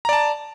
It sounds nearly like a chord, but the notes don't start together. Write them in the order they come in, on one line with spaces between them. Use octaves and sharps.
A#5 D5 A5